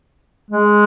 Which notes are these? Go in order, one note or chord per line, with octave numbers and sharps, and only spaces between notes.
G#3